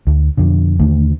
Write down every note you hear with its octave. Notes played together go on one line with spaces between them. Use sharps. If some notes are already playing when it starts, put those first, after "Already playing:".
D2
F2 B2 D3
D#2 D3 A3